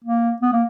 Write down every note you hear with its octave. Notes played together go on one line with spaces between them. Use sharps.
A#3
B3
A#3